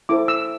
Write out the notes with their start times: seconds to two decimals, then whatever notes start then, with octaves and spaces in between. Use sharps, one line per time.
0.09 E4 A4 C5 D6
0.28 E6